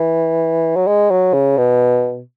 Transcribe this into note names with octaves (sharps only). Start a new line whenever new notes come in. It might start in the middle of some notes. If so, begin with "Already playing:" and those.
Already playing: E3
F#3
G#3
F#3
C#3
B2